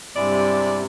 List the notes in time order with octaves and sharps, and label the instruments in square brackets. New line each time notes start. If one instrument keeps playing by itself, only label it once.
[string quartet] G2 C3 [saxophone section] G#3 E4 D5